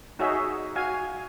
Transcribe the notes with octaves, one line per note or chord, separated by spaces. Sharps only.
D#4 F#4 G#4 C#5 D#5 E5
F#4 F5 G#5